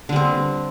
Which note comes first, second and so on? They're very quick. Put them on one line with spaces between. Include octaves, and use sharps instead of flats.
D3 G3 C4